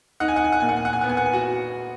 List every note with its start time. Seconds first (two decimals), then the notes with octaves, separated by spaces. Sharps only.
0.20 D#4 F#5
0.28 G#5
0.36 F#5
0.44 G#5
0.52 F#5
0.60 A#2 G#5
0.69 F#5
0.76 G#5
0.85 F#5
0.93 G#5
1.01 B3 F#5
1.09 G#5
1.17 F#5
1.26 G#5
1.33 F#4 F#5